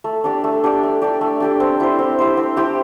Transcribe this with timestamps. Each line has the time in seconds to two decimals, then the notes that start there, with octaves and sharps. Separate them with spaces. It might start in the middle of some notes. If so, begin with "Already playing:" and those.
0.04 A3
0.24 D4 G4 D5
0.44 A3
0.64 D4 G4 D5
0.83 A3
1.02 D4 G4 D5
1.21 A3
1.40 D4 G4 D5
1.60 C4
1.80 E4 G4 C5
1.99 C4
2.19 E4 G4 C5
2.37 C4
2.56 E4 G4 C5